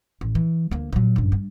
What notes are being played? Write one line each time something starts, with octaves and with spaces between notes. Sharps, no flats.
A1
E3
D2 A#3
A#2 F#3
G1 F#2
G2